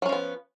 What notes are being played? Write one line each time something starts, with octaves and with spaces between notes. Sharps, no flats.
F3 F#3 B3 C#4